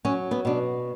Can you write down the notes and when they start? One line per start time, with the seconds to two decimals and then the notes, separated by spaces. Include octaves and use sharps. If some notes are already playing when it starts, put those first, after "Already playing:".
0.05 F#3 C#4
0.31 B3
0.45 B2 D4